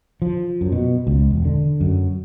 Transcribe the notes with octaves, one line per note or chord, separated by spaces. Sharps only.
F3
F#2
B2
C#2
E1
D3
F#2